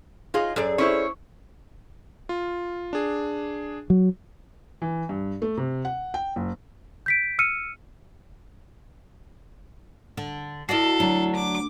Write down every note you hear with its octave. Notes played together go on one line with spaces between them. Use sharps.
D#4 F4 G#4 D#5
F#2 G#4 A4 D5
C#4 E4 C5 C#5
F4
D4 G#4
F#3
E3
G2
A3
C3
F#5
G5
F#1
G6 B6 D7
E6 F6 C#7 D#7
D3
E4 F#4 A4 D5 D#5 C7
D2 F#3 D4
D6